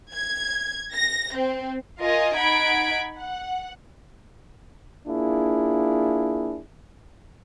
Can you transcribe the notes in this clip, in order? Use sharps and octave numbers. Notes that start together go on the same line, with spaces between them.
G#6
A#6
C4
F4 A#4 D#5 G#5
D#4 F#5 B5 G#6 D7
F#5
A#3 D4 E4 F4 G#4